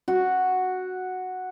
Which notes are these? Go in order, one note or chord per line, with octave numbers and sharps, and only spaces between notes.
F#4